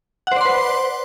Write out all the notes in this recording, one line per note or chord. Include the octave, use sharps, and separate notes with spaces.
B4 C5 D5 F#5 C6